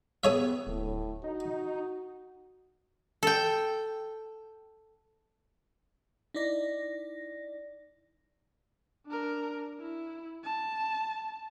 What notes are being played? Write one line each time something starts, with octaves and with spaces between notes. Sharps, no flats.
B3 G4 G#4 C#5 E5
D1 A2
D#4 F#4
A4 G5
D#4 E4 D5 A#6
D4 A#4
E4
A5